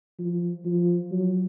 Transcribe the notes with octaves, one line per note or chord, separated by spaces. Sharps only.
F3
F3
F#3